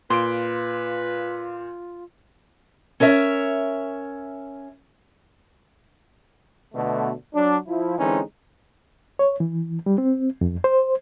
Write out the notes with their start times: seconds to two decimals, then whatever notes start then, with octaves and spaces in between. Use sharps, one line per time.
0.10 A#2 F4 B4 C6 D7
3.00 C#4 A#4 C#5 E5
6.74 B2 D3 A3
7.34 F#3 D4
7.67 F3 E4
7.98 D3 E3 G#3 C4 C#4 D#4
9.19 C#5
9.40 E3
9.86 G3
9.98 C4
10.41 F2
10.64 C5